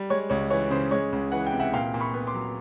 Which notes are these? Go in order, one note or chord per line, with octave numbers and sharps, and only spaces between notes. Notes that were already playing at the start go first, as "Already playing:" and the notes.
Already playing: G3
G#3 C#5
C#2 C#5
E3 C#5
C#3 C5
G#3 C#5
C#2
E3 F#5
G5
C3
E5 F#5
A#2 F5 G5
A#2
B5 C#6
B3
C6 D6
F#3